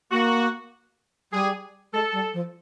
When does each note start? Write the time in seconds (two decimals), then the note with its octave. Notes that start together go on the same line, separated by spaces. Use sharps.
0.11 A#3 F#4
1.32 G3 G#4
1.93 G#3 A4
2.13 G3
2.33 F3